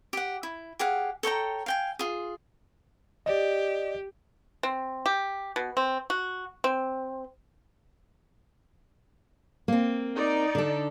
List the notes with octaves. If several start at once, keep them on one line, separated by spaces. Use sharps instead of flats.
G4 F#5
E4
G4 G#4 F5 F#5
A4 C#5 G5 A#5
F5 G5 G#5
F4 G#4
G4 D5 D#5
C4
G4
B2
C4
F#4
C4
A#3 C4
D#4 D5
D3 A4